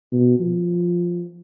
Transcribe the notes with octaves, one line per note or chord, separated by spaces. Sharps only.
B2
F3